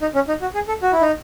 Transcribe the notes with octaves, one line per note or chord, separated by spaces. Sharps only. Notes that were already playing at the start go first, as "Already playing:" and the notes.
D#4
C#4
D#4
F#4
G#4
A4
F#4
E4
D#4